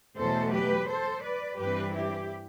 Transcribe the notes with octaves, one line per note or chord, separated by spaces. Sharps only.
E2 B2 F#3 A3 A4 C5
G4 B4
A4 C5
B4 D5
G2 E3 G3 C4 G4 B4
E4 G4